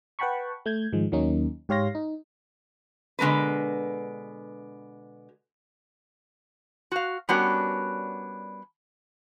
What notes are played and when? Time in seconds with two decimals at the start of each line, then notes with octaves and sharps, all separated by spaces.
0.19 B4 F#5 G5 A5 B5 C#6
0.66 A3 G6 G#6
0.93 G#2 D#3 F3 G#3
1.12 D#2 D#3 F#3 A#3 C#4 D#4
1.69 G#2 G4 C#5 F5 C6 A#6
1.95 D#4
3.19 B2 D3 G#3 A#4 B4
6.92 F#4 F5
7.29 G3 B3 C#4 D4 F#4 A#4